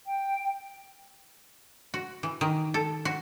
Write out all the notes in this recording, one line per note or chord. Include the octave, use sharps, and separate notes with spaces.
G5
F#4
E3
D#3
A4
F#4